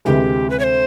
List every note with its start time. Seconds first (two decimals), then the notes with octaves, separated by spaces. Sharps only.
0.05 D2 C3 E3 G#3 G4
0.50 B4
0.59 C#5
0.64 C5